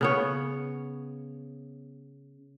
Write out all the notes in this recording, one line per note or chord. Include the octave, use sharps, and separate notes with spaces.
C#3 B3 C#5